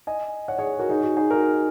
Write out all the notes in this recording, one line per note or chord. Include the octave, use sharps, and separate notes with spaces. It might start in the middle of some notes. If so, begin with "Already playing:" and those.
D#5 G#5
C#5 F#5
G#4 C#5
F#4 A#4
D#4 G#4
F#4
D#4 G#4
F#4 A#4